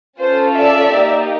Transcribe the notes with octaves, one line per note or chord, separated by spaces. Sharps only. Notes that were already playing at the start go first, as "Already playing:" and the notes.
C#4 F4 A4 C5
D5 E5
A#3 D#4 G4